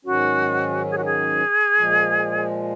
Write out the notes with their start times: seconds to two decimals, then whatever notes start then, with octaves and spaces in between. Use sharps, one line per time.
0.05 G#2 D#3 F#3 C#4 F#4
0.91 G#4
0.98 F#4
1.05 G#4
1.76 A#2 F3 G#3